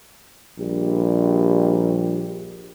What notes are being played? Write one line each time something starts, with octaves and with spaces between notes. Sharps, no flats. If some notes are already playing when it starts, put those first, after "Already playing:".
A#1 G3 G4